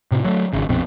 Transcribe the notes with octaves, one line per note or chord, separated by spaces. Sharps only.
A2 C3
F#3 G3 A3
G#1 C#3
A#1 F2 B2 C4